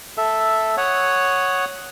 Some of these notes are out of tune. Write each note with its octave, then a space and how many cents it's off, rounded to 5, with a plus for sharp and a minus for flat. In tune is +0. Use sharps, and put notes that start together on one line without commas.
A4 +0 E5 +0
C#5 +0 F#5 +0 D#6 +0